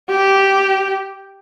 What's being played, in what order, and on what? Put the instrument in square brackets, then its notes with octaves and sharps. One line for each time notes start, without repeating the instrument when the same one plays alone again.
[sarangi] G4